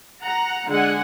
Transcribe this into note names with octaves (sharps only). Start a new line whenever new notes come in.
F#5 A#5
D3 G#3 F#5 G#5